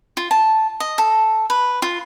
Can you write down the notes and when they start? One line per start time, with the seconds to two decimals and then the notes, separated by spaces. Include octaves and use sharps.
0.17 F4
0.31 A5
0.80 D#5
0.98 A4
1.50 B4
1.82 F4